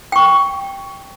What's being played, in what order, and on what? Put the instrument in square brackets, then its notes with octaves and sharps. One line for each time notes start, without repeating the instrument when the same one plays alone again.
[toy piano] G5 C#6